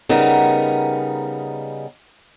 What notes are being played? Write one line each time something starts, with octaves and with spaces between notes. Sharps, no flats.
C#3 G3 B3 D#4 A#4